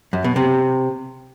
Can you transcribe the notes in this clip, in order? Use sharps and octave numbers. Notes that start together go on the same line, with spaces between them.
F#2
B2
C3